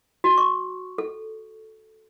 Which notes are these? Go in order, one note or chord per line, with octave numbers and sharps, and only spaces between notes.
F#4
C#6
A4